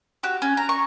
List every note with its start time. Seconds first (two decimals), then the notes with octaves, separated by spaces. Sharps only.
0.23 F#4 G4
0.42 C#4
0.57 A#5
0.69 C#6